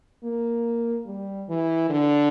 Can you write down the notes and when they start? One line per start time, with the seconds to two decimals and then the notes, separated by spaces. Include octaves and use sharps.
0.24 A#3
1.06 G3
1.49 E3
1.90 D3